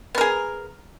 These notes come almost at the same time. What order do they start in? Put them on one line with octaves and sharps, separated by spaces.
B3 A#4 G#4